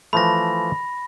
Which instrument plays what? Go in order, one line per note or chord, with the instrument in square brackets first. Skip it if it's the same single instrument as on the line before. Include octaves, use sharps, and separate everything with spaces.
[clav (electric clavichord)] E3 F3 A3 [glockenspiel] B5 A#6